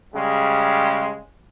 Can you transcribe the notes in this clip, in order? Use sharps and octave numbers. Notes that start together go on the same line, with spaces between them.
C#3 G3 G#3